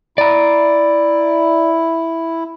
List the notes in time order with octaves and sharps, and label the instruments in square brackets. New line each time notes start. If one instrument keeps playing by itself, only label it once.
[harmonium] E4 [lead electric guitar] D5 A#5